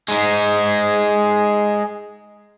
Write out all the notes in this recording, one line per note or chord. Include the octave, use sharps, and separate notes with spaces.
G#3 D#4